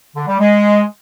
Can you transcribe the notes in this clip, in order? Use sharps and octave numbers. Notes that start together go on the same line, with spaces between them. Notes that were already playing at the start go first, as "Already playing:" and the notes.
D3
G3
G#3